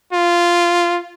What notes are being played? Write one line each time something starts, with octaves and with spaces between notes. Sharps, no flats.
F4